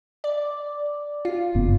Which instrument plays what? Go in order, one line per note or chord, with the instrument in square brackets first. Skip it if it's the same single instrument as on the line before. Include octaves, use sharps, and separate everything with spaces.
[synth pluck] D5
F4
[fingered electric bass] F#1 G2 B3